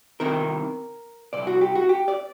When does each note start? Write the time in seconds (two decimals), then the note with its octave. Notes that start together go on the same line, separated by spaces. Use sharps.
0.20 C2 C3 D#3 A#4
1.33 A#2 D5
1.37 C2
1.47 F#4
1.61 G4
1.75 F#4
1.89 G4
2.08 D5